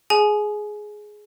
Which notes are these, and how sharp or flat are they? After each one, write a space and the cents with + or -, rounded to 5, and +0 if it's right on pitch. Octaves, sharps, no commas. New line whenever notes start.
G#4 +10 G#5 +25